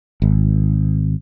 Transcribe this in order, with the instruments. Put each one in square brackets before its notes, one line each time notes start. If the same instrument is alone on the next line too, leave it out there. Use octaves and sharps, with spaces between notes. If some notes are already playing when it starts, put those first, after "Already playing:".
[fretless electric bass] G#1